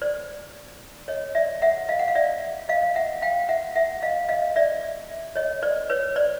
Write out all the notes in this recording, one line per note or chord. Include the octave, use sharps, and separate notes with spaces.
C5 D5
C#5 D#5
D5 E5
E5 F#5
D#5 F5
F#5
F5
D5 E5
D#5 F5
E5 F#5
F5 G5
E5 F#5
E5 F#5
D#5 F5
D#5 F5
D5 E5
C#5 D#5
C5 D5
B4 C#5
C5 D5